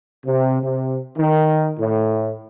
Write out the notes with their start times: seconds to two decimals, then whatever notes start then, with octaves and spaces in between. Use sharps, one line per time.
0.25 C3
0.61 C3
1.17 D#3
1.79 A2